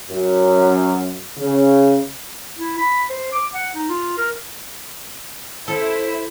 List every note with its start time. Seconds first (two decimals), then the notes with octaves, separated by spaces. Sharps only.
0.10 F#2
1.38 C#3
2.58 E4
2.77 B5
3.10 C5
3.32 D6
3.54 F#5
3.75 D#4
3.89 F4
4.18 A#4
5.68 E4 A4 C5